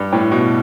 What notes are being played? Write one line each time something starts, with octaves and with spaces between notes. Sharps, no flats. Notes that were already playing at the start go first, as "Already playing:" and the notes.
Already playing: G2
A2
B2